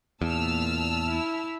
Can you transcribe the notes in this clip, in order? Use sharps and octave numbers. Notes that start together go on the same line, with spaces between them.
E2 A#2 A5 E6 F6
E4